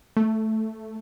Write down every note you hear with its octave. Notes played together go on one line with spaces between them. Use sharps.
A3